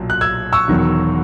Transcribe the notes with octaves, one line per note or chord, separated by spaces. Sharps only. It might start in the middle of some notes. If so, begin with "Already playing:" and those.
Already playing: B1 A#2 F#3
F#6
E6 G#6
C#6 E6
E1 E2 D#3 F#3